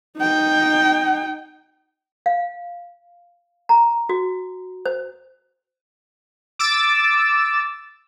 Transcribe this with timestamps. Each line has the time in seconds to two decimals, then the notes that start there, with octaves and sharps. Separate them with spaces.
0.18 D#4 G5
2.26 F5
3.69 A#5
4.09 F#4
4.86 C5
6.59 D6 E6 A6